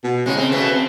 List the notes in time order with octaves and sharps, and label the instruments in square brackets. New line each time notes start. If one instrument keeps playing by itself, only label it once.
[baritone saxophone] B2
[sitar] A2 G#3 [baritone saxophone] C#3
[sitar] C4
B2 A3 B3
C4